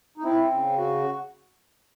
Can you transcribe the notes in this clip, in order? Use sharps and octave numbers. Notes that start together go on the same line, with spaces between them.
D#4
C4 E4
C#3
F#4